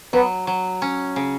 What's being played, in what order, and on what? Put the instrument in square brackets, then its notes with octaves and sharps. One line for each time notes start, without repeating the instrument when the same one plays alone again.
[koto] F#3 [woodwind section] B3
[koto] F#3
C#4
C#3